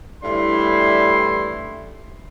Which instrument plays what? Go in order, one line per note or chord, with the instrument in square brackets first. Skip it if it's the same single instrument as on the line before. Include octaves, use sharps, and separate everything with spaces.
[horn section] A2 E3 G3 D4 E4 C6